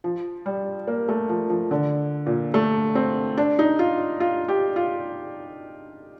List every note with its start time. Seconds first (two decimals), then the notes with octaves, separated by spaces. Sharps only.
0.04 F3
0.46 G3
0.87 A#3
1.08 A3
1.29 F3
1.50 F3
1.71 D3
2.26 A#2
2.54 A3
2.95 C4
3.37 D4
3.59 D#4
3.79 F4
4.20 F4
4.48 G4
4.76 F4